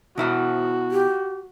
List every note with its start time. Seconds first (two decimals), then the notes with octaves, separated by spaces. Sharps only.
0.18 B2 E4 F#4 F#5
0.91 G4